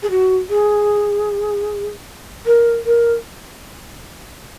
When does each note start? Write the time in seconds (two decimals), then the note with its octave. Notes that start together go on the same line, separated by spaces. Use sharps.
0.02 G#4
0.10 F#4
0.49 G#4
2.45 A#4
2.85 A#4